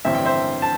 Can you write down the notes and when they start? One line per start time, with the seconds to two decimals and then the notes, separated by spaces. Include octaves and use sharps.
0.05 A1 G2 D3 C4 E4 E5
0.15 G5
0.25 C5 E5
0.62 A5